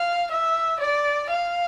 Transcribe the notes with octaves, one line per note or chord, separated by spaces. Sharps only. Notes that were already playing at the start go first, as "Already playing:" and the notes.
Already playing: F5
E5
D5
F5